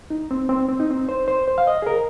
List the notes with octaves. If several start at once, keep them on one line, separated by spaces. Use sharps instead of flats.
D#4
C4
C4
C4
D#4
C4
C5
C5
C5
F5
D#5
G#4
A#4